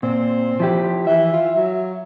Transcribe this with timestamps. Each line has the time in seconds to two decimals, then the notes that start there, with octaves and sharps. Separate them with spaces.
0.03 A#2 C4
0.60 F3 E4 G4
1.07 E3 E5
1.33 F4
1.56 F#3